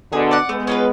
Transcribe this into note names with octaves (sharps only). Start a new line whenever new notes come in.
B2 D3 G#4
D5 F#5
G#3 A3 B3
C#4 F4 B4